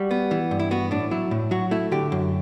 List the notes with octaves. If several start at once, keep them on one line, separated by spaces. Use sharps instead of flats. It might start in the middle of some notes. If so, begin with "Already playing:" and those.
Already playing: G3 F#4
B3
E3
G2
E4
B3 F#4
A2 D4
F#3 E4
A2
F#3 F#4
A3 E4
D3 G4
F#2